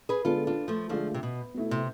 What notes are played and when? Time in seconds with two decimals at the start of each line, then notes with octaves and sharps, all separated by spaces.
0.09 G#4 B4
0.25 D3 G#3 B3 F4 A4
0.47 D4 F4
0.68 F3 A3
0.89 D3 F3 G#3 A3 D4 F4
1.14 C3
1.23 B2
1.54 B2 A3 E4
1.71 C3